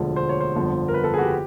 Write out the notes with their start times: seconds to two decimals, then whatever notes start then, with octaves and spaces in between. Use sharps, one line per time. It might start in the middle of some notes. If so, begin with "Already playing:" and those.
Already playing: E1 D2 D3 F3
0.16 C5
0.29 C#5
0.40 C5
0.55 G1 F2 D3 F3
0.88 A#4
0.94 B4
1.04 A4
1.14 G#4
1.18 F#4
1.22 G4